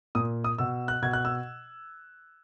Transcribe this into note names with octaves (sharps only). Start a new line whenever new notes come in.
A#2 D#6
D#6
B2 E6
F#6
B2 G#6
F#6
E6